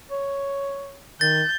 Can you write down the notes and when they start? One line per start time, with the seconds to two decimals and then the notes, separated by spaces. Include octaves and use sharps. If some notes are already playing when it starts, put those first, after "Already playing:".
0.11 C#5
1.21 D#3 G6 A6